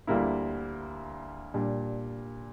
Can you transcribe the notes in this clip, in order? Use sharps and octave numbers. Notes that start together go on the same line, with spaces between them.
D2 D3 G3 A#3 E4
A#2 G3 D4